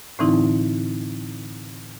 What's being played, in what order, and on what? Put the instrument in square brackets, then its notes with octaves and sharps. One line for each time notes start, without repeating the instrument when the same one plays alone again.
[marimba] A2 D3 E3 C4 D#4 E4